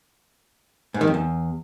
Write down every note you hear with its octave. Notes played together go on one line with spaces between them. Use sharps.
G#2
D#3
F2
E2